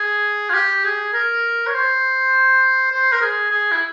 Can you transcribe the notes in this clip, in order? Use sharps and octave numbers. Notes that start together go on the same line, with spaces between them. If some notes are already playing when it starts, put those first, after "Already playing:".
Already playing: G#4
F4
G4
G#4
A#4
C#5
C5
C5
A#4
G#4
G#4
E4